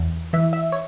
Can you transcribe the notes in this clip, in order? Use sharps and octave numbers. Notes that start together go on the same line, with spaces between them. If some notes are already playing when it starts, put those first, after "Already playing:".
Already playing: E2
E3 E5
E5
C#5